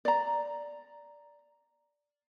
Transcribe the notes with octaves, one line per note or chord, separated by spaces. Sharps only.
D5 A#5